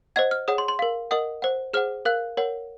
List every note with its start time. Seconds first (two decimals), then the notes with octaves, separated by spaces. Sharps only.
0.16 C5 D#5 F#5 G#6
0.31 F6
0.48 G#4 C#5 F#5 D#6
0.58 C6
0.68 C6
0.79 A#4 F5
1.11 A#4 D#5 F#5 D#6
1.42 C5 F#5
1.74 G#4 C5 F#5 F6
2.05 A#4 F5 F#6
2.37 A#4 C#5 F#5